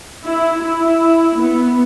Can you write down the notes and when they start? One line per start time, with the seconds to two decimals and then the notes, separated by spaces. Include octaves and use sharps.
0.25 E4
0.62 E4
1.38 B3